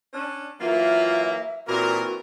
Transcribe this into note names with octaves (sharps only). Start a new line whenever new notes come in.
C#4 D4
E3 F#3 A#3 F4 E5
A#2 E3 A#3 C4 F#4 A#4